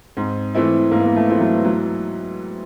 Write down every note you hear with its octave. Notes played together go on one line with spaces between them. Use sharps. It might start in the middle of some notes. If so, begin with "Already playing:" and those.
G#2 C4
E3 A3 C4 E4
G#2 A#3
B3
A#3
A3
E3 A3 C4 E4
F#3
F#3